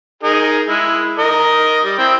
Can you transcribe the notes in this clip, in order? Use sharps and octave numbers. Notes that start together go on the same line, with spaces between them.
D#4 G#4 A#4
G#3 E4
A#4 D#5
G3
C4 E4 G5